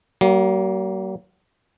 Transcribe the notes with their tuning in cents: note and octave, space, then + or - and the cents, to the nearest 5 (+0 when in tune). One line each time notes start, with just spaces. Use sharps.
F#3 +45 A#3 +0